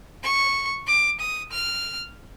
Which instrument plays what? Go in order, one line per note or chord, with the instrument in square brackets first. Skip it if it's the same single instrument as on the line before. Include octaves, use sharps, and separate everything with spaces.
[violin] C#6
D6
D#6
F6